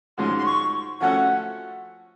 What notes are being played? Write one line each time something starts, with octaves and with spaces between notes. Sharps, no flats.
G#2 F3 G#3 C#4 F#4 C6
C6
C#6
F3 A3 C#4 F#4 A4 F#5